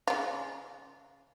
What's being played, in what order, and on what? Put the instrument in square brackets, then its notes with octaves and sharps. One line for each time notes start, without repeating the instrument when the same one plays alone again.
[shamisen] C#3 F4